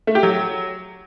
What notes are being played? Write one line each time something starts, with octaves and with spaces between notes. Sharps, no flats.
A3
G4
F#3